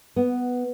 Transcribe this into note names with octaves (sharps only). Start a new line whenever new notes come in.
B3